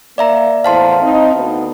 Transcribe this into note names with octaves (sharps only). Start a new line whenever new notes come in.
A#3 D5 E5 A#5
E2 A2 C5 F5 A5 C6
C4 D#4
D2 B3